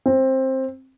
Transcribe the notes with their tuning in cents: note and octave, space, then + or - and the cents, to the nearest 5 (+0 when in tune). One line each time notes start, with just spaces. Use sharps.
C4 +15